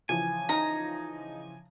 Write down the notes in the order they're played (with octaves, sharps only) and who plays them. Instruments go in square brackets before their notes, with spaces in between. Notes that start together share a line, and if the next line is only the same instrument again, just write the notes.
[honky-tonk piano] C#3 E3 F3 [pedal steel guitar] G#5
[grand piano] D#4 [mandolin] A#5